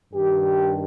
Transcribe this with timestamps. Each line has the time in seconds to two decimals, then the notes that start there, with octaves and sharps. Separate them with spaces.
0.13 G2 D#3 G4